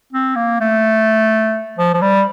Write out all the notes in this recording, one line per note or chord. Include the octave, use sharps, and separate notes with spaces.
C4
A#3
A3
F3
F3
G3